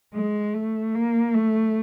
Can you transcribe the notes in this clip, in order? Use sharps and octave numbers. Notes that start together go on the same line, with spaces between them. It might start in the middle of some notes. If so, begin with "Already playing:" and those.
G#3
A3
A#3
A3